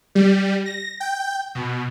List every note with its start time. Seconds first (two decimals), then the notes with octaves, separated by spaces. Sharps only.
0.15 G3
0.66 A#6
1.00 G5
1.55 B2